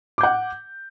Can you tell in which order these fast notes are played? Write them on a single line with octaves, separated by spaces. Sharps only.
D6 G6 F#5